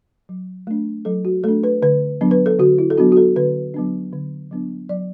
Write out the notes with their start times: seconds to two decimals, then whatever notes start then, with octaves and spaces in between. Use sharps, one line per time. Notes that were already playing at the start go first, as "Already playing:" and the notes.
0.29 F#3
0.67 A3 D4
1.05 F#3 A4
1.25 F#4
1.44 A3 D4 A4
1.64 B4
1.82 D3 B4
2.21 F#3 B3 D4
2.31 B4
2.46 A4
2.59 D3 F#4
2.78 E4
2.90 A4
2.97 F#3 B3 D4 F#4
3.12 F#4
3.17 A4
3.36 D3 B4
3.74 F#3 B3 D4
4.13 D3
4.51 F#3 B3 D4
4.89 F#3 D5